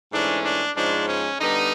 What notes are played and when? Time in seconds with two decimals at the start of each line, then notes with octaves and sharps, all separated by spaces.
0.12 G#2 E3 A3 C#4 D4
0.44 D4
0.76 G#2 F3 G#3 C#4 D4
1.08 C#4
1.40 D3 G3 B3 D#4